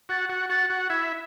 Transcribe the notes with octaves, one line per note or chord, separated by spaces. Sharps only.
F#4 F#5 A6
F#4 F#5
F#4 F#5 A6
F#4 F#5
E4 E5 G#6